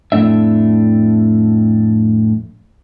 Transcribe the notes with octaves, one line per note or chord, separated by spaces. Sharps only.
F2 A2 A3 D4 E5